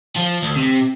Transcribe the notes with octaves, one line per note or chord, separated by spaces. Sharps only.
F3
D2
C3